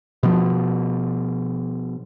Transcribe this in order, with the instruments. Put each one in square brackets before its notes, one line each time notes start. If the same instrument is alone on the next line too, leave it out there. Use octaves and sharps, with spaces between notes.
[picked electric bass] B2 F3